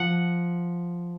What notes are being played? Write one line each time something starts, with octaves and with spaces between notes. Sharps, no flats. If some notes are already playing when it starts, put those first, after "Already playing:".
Already playing: F3 F#5